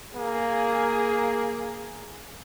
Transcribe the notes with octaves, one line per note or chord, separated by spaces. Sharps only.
A#3 G#4